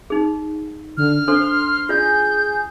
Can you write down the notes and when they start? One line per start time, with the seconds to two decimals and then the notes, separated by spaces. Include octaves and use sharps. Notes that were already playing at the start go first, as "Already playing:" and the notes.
0.10 D#4 G#4
0.97 D3 F6
1.28 D4 A4 C5 C6
1.89 F4 G#4 D5 G6